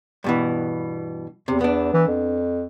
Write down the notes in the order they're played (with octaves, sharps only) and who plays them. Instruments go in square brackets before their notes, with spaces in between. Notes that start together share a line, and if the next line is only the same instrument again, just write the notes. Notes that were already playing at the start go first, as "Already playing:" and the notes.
[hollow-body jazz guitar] G2 B2 E3
[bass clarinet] E2 [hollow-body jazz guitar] C3
[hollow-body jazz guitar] B3 D4
[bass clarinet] E3
F2